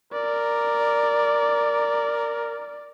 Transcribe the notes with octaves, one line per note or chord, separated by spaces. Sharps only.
A#4 D5